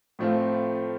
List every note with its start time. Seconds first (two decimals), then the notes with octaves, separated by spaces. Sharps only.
0.19 A2 F3 A3 C4 F4